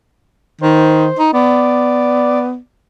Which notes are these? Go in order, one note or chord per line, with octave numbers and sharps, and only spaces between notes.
D#3 C5
D#4
B3 D5